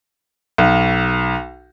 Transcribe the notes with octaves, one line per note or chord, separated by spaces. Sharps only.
B1